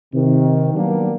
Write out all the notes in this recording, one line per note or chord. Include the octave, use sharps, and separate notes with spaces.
C3 D#3
D#3 F#3 G3 A#3 B3 D4